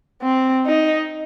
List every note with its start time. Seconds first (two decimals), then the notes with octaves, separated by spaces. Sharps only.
0.22 C4
0.66 D#4